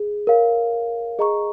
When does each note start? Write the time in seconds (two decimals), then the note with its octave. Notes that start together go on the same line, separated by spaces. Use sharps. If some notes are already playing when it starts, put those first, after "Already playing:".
Already playing: G#4
0.27 A#4 C#5 F5
1.19 G#4 D#5 A#5 C#6